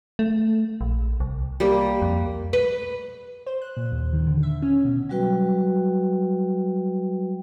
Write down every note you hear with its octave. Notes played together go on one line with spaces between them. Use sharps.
A3
A#1
C2
G3 A#3
F2
B4
C5
F#6
A#2
D#2
D#3
D3
E5
C#4
B2
F#3 G3 F#4 B4 G5